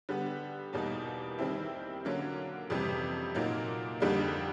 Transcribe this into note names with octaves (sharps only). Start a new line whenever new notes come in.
D3 G3 B3
E2 B2 G3 A#3 D#4
D#3 G3 C4 E4
D3 F#3 A#3 C#4
F2 C3 E3 G3
A#2 F#3 A#3 D#4
F2 D3 G3 A#3 D#4